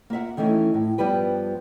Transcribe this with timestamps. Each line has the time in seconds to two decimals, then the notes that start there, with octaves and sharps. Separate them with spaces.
0.10 A#3 F4 E5 F#5
0.37 D#3 E3 A3 C#4 D#4
0.74 A2
0.98 G2 F3 G3 B3 B4 G5